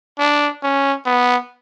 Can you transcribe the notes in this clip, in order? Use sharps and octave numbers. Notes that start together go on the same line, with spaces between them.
D4
C#4
B3